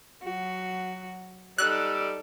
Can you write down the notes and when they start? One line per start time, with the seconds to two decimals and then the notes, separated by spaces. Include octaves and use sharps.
0.23 F#3 F#4
1.58 G3 D#4 A4 D5 E6 F#6